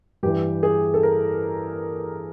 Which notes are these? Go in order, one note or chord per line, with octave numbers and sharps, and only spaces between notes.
G2 E3 G4
G#4
A4
A#4